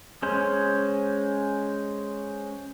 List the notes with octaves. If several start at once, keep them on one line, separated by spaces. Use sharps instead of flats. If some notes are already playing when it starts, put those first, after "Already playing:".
G#3 C#4 C5